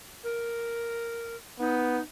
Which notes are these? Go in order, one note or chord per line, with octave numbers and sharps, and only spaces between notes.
A#4
B3 D#4